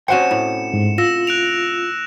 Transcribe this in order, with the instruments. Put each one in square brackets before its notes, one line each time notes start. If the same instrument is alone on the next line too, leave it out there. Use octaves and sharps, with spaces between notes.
[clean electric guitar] C3 F#5 G5 [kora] C#4 F#4 C5 [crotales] C#7 E7
[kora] A2
[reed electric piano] G#2
[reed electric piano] F4 [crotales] E6 A#6 E7
[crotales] F#6 D7 F7